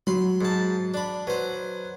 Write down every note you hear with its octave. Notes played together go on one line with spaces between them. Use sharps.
F#3 B5 C6
G#2 A5
D4 B5
F#3 B4 C5